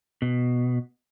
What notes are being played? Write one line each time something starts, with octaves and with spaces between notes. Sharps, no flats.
B2